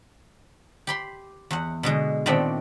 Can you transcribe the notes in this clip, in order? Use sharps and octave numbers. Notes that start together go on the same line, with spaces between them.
G4 B5 C6
E2 F#5
B2 D3 G#3
A#2 D#3 A3 B3 C4 D4